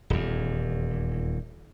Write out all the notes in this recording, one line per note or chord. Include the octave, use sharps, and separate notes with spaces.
D#1 E2